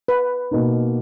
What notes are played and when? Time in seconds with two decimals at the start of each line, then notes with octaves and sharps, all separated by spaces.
0.08 B4
0.51 B2 A#3 D#4